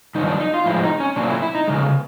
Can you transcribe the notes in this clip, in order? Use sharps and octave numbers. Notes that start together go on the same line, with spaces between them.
G2 D#3 F#3 D#4
D4
D#4
F4
A2 F3 G#3 E4
D#4
C#4
A#2 F#3 D4
E4
E4
D#4
E2 C#3 G#3